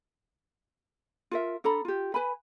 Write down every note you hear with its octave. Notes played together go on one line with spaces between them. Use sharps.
F4 A#4 E5
D4 A4 A#5 B5
F4 G4
B4 G#5 B5